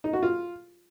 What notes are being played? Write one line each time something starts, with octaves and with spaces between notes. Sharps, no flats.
D#4
F#4
F4